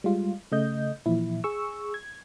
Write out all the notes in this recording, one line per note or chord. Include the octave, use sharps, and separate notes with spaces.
G3 G#3 F4
C#3 A3 D#5 G6
A#2 E3 F3 E4
G#4 C#6 E6
G#6